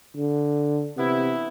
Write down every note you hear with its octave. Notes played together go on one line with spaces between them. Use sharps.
D3
C3 E3 B3 E4